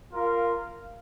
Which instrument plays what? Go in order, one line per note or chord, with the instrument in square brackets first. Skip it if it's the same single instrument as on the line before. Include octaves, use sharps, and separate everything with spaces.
[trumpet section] F4 A#4 F5